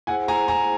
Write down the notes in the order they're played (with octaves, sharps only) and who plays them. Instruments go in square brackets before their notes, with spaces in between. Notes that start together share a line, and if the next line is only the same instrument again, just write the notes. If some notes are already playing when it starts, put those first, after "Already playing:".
[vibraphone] E4 G#4 C5 [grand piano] F#5 G#5
[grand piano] G#5 A#5
G#5 A#5